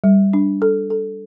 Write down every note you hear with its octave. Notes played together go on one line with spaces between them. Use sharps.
G3
D4
A4
A4